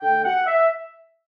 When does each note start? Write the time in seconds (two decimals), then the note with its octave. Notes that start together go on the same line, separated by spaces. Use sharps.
0.02 D3 A3 D4 G5
0.25 F#5
0.47 E5